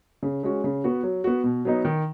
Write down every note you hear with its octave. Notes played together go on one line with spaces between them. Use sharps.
C#3
G#3 C#4 F#4
C#3
B3 F#4
F#3
B3 F#4
B2
F#3 B3 D#4
D#3